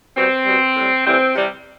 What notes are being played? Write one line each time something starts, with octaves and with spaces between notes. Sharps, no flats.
B2 G3 C4
B2 G3
A2 G3
A2 E3 G3 C4
C3 E3 G3